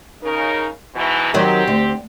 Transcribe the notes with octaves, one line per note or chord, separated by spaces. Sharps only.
C#3 D#4 A#4
G#2 B2 E3
D#3 F#3 C4 G4
D2